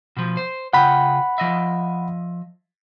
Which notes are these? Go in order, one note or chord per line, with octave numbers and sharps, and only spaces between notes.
B2 F3
C5
C#3 F4 F#5 G5 B5
F3 D#5 E5